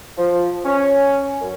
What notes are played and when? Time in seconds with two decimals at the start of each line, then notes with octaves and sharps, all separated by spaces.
0.18 F3
0.65 C#4
1.42 F#2